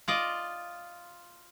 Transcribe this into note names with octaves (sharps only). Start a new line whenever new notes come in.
F4 D5 D#5